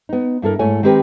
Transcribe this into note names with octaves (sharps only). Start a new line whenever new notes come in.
B3 D#4
G2 E4 A4 A#4
G#2 A3 E4 C#5 G#5
D#3 G#3 C4 G4 A#4 B4